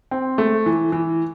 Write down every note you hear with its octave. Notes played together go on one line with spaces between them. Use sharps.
C4
A3
E3
E3